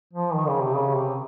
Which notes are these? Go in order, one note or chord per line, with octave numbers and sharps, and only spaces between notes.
F3
D#3
C#3
C3
C#3
C3